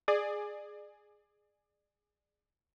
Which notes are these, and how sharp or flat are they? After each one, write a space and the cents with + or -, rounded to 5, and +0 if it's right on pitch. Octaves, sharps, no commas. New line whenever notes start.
G#4 +0 D5 +25